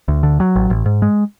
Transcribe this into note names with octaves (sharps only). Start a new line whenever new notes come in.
D2
D3
F#3
A1
A1
G#2
G#3